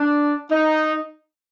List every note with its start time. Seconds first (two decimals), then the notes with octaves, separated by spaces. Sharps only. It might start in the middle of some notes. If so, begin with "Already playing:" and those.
Already playing: D4
0.51 D#4